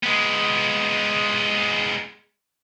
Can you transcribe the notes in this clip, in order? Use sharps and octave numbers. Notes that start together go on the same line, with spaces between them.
G#3 B3